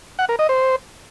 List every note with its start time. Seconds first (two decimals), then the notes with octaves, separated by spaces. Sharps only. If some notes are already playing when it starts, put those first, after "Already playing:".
0.19 F#5
0.29 A#4
0.39 D#5
0.49 C5